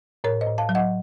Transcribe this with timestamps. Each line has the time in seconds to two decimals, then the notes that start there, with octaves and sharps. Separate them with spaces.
0.24 A2 A#4 C#5
0.41 C5 D#5
0.47 A2
0.58 F5 A5
0.69 F#3
0.75 D#5 F#5